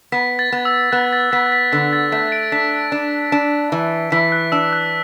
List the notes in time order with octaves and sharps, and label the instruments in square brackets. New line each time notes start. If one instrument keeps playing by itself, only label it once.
[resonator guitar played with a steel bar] B3 [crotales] B6
[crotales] A6
[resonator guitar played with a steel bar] B3
[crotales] E6
[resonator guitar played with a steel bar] B3 [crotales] F#6
[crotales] A6
[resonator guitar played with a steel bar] B3 [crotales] B6
[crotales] B6
[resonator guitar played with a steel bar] D3 [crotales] B6
[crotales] A6
[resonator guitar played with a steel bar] A3 [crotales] B6
[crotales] D7
[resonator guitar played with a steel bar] D4 [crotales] B6
[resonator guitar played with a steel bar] D4
D4
E3
[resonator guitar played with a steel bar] E3 [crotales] B6
[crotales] F#6
[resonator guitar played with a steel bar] D4 [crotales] E6
[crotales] F#6